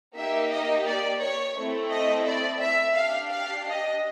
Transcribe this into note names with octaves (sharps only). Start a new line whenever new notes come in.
A#3 D#4 G4 E5
D#5
D5
C#5
A3 C4 E4
D#5
D5
E5
D4 G4 F5
F5
D#5